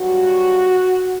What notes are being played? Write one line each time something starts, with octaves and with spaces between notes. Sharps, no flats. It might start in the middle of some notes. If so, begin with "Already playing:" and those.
Already playing: G2 F#3 F#4